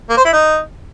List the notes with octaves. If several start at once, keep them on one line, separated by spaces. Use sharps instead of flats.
A#3
C5
E4
D#4